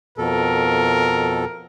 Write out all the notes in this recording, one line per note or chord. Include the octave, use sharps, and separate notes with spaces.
F2 B2 A4 A#4